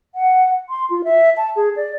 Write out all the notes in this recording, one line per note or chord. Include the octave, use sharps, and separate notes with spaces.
F#5
C6
F4
E5
A5
G#4
D5